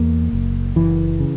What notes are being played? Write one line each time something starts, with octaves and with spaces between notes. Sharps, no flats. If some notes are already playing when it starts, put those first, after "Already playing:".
Already playing: E2 A#3
F#1
F#1 E3
C#3